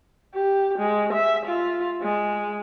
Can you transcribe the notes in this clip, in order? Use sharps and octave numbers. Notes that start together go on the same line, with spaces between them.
G4
G#3
E5
F4
G#3